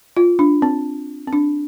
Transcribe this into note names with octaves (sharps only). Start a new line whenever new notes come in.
F4
D4
C4
C4
D4